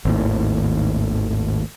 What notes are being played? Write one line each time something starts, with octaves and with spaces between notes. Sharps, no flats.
G#1 D#2 A2